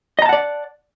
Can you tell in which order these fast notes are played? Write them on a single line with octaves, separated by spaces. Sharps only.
D#5 A#5 A5 F#5 D5